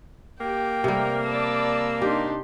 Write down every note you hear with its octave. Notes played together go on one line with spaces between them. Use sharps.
A#3 G4 G5
C3 G3 A3 A#4
D5 A5 B5 E6
D4 D#4 G4 C6